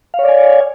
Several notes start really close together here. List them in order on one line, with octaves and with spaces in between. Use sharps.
F5 C#5 D5 G#5